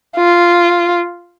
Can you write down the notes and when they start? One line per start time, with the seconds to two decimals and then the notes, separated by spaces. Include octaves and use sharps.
0.17 F4